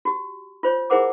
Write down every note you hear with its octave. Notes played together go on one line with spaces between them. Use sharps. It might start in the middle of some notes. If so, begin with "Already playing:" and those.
F#4 G4
F4 C5 C#5
E4 G#4 A#4 C5 F#5 D6